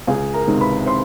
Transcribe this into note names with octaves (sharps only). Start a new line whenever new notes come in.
C#2 G#4 G#5
A#4 A#5
C3 D#3 G#3
B4 B5
C5 C6